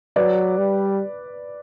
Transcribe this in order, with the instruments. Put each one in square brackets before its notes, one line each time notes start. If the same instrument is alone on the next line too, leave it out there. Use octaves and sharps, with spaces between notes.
[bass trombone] F#3 [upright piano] B4 D5
[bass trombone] G3